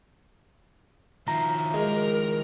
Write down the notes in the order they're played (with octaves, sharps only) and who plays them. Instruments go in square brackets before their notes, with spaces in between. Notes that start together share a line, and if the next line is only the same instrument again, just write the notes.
[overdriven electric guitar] D#3 F3 [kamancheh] E5 [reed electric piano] A#5
[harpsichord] G#3 [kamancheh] A#4